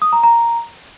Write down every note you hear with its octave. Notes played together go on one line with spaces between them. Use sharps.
D#6
A#5
A#5